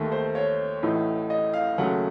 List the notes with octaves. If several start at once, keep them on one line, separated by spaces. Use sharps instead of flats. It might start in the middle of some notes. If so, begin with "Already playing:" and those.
Already playing: D#2 D#3 A3
C5
C#5
A1 A2 A3 D#4
D#5
F5
D#2 C#3 F#3 A3 F#5